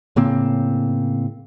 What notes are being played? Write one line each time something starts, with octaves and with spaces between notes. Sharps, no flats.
A2 C#3 A#3 C4